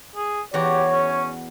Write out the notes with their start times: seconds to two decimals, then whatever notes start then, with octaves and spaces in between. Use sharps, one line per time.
0.15 G#4
0.54 E2 F#4 G4 C#5
0.92 C#4